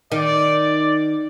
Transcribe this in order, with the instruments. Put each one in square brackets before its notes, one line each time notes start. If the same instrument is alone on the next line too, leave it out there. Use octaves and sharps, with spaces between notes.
[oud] D#3 [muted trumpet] D5